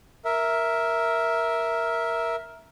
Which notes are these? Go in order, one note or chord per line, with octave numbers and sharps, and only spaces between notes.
A#4 E5